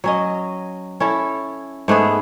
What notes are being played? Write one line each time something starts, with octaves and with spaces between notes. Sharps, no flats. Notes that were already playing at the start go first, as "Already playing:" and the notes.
F#3 C#4 D#5
C#4 E4 A4
G#2 A3 B3 G#4